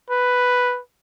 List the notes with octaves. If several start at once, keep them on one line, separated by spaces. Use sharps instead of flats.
B4